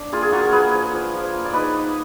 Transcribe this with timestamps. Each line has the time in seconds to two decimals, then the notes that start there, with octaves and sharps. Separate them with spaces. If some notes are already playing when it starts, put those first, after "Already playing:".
Already playing: D4
0.12 A#3 F4 G#4
0.23 G#4
0.32 A#3 F#4 A#4
0.52 A#3 G#4 B4
0.73 F3
0.93 F3
1.13 F3
1.33 A#3
1.45 D5
1.53 D#4 B4 D#5
1.74 D#4